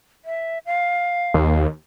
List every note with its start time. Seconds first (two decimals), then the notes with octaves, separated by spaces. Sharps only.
0.25 E5
0.66 F5
1.34 D#2